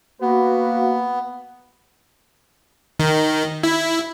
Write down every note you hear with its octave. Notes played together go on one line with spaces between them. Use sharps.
A#3 B3 F#4 B4
D#3
E4